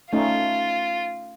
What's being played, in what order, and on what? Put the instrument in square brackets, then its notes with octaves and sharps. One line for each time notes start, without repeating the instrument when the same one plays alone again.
[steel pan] A3 C#4 D#4 [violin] F4